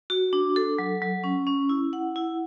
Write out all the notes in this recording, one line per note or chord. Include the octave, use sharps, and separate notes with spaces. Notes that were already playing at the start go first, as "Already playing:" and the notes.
F#4
D4
A4
F#3
F#3
C#4
C#4
E4
F#5
E4